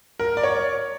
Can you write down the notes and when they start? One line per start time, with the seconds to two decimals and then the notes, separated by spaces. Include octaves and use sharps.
0.20 A#4
0.37 D5
0.43 C#5